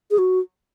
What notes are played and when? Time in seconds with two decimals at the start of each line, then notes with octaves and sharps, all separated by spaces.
0.11 G#4
0.18 F#4